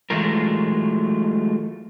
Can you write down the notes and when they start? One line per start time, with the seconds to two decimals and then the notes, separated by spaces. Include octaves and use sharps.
0.10 E3 F#3 G#3 A3 F4 A#4